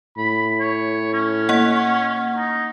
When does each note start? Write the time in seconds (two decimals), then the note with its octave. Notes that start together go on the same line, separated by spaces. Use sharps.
0.17 A2 B5
0.60 C#5
1.13 C#4
1.49 A#3 F#5
2.36 D#4